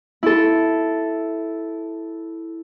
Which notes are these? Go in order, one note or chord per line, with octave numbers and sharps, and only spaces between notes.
E4 A4